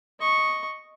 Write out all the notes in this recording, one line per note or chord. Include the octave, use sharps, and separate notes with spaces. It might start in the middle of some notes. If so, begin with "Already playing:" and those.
D#5 C#6